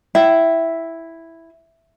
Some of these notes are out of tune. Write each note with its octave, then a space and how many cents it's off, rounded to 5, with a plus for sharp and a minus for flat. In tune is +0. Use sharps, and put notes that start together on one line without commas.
E4 +0 E5 +0 G5 -25